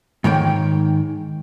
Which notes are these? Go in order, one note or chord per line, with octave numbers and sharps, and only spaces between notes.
G#2 D#3 C#5 G5